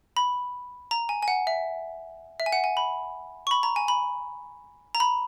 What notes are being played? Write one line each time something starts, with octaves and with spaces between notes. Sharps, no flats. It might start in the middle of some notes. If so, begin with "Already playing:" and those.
B5
A#5
G#5
G#5
F#5
E5
E5
G#5
F#5
G#5
B5
C#6
B5
A#5
G#5
B5
A#5
B5